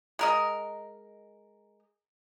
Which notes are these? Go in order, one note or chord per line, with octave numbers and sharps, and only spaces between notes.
G#3 A#4 D#5